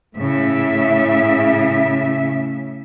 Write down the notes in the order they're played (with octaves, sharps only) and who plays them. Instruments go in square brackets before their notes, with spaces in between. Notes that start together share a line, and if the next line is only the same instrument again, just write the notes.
[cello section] A2 C#3 E5